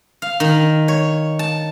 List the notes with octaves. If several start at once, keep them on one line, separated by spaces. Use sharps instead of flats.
F5
D#3
C#5
A5